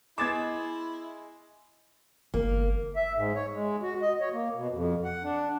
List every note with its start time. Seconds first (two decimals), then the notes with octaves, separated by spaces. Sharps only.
0.18 G#3 B3 E4 D6 G#6 A6 E7
2.34 G1 A#3
2.96 E5
3.16 G#2
3.35 C#5
3.53 G#3
3.82 F#4
4.02 D#5
4.20 C#5
4.32 A#3
4.56 B2
4.72 F2
5.04 F#5
5.24 D4